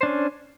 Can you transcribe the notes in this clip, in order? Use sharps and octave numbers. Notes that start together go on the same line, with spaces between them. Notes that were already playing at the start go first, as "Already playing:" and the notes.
C#4 D4 C5